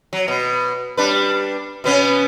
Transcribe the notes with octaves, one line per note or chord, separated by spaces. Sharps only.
F#3
B2
G3 D4 B4
B2 B3 C#4